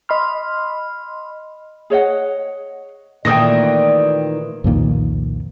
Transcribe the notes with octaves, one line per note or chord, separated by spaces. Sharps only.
D#5 B5 C6 F6
G#4 C#5 D#5 F#5
A#2 D#3 E3 A3 D5 G5 D#6 A#6
C2 F2 A#2 D#3